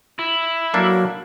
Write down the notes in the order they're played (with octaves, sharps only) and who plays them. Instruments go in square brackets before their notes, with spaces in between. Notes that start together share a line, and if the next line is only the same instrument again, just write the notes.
[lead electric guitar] E4
[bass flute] F#3 [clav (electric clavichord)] A#3 D4 A4